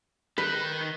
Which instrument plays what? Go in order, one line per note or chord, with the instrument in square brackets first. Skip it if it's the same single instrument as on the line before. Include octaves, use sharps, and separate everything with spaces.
[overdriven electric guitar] D#3 [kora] B4